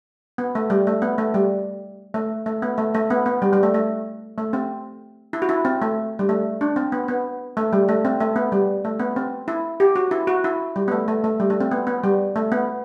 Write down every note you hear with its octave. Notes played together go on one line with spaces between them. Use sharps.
B3
A3
G3
A3
B3
A3
G3
A3
A3
B3
A3
A3
B3
B3
G3
G3
A3
A3
A3
C4
E4
F#4
E4
C4
A3
G3
A3
D4
C4
B3
B3
A3
G3
A3
C4
A3
B3
G3
A3
B3
C4
E4
G4
F#4
E4
F#4
E4
G3
B3
A3
A3
A3
G3
A3
C4
B3
B3
G3
A3
B3